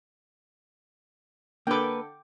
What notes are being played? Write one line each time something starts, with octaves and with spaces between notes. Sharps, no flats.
D3 A#3 A4 B4 G5 D6